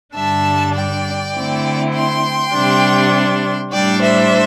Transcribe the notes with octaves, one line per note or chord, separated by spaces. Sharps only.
G2 D3 G3 D4 E5 A5
D5 G5
D3 A3 C4 E4
G5 C6
C3 G3 D4
A2 G3 D4 D5 G5
C5 E5